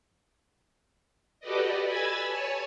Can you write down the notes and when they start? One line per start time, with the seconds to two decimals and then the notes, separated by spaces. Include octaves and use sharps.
1.40 F#4 G4 A4 B4 D5 D#5
1.85 G#5 B5 E6 G#6 A6
2.26 C#5 G#5 A5